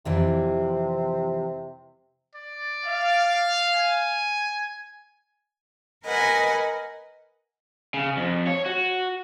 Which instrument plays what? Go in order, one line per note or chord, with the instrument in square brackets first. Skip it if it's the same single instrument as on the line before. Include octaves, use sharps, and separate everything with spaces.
[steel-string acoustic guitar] F2 E3 G3 [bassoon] C3
[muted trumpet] D5
[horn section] F5
[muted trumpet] G#5
[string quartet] A#4 B4 D#5 F#5 G#5
[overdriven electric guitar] C#3
F2
C#5
F#4